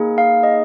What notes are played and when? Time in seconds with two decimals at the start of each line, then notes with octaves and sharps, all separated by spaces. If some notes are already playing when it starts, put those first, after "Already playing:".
Already playing: A#3 D#4 G#4
0.18 F5
0.43 D#5